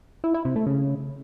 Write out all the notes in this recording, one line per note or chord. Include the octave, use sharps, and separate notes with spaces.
E4
E4
C3
A3
C#3